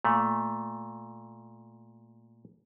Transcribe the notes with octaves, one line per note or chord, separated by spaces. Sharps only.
A#2 A3